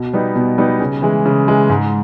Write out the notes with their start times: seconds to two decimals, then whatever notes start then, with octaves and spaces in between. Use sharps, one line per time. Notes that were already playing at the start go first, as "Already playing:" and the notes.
Already playing: B2
0.13 G3 B3 D#4
0.36 B2
0.58 G3 B3 D#4
0.80 C#3
1.02 E3 G#3
1.26 C#3
1.47 E3 G#3
1.70 G#2